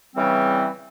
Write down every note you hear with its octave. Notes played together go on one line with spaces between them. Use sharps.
C#3 E3 G3 C4